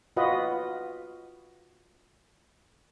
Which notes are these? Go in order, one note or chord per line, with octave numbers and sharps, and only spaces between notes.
F4 F#4 B4 D#5